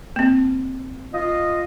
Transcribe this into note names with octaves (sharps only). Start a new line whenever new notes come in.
A#3 C4
F4 D#5